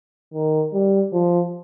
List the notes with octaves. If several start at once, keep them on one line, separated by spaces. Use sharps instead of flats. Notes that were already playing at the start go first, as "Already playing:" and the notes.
D#3
G3
F3